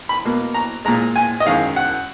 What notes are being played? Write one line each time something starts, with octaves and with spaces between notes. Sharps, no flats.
B5
B2 A#3
A#5
A#2 G#3 A#5
G#5
D#5
F#2 D#3 G#3 F5
F#5